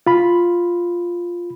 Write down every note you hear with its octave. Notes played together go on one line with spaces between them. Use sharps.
F4 B5